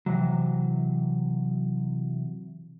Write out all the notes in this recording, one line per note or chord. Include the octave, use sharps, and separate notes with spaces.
C3 E3 F#3